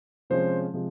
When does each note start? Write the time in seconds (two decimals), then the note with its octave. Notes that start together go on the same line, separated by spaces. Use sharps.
0.30 C3 F3 G#3 C#4 C5
0.74 C3 F3 G#3